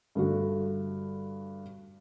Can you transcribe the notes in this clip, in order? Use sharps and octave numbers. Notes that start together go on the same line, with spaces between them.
G2 D3 A3 F#4